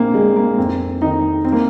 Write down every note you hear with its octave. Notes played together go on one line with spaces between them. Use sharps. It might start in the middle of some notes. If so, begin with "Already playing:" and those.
Already playing: A#1 A#3 C4
A#2 G#3
A#3
F1 C4
F2 D#3 D#4
C4
A#3